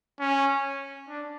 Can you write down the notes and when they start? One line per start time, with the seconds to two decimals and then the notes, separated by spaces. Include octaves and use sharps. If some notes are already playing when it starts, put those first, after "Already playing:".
0.20 C#4
1.08 D4